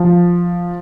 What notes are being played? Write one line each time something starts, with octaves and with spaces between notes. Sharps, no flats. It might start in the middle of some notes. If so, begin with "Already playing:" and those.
Already playing: F3